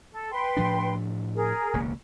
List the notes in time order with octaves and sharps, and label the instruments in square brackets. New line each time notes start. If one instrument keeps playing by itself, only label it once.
[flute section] A4
B4 G5 C6
[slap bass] A2 F3 D4
[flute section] G#4 A#4
[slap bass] E1 C#2 A#3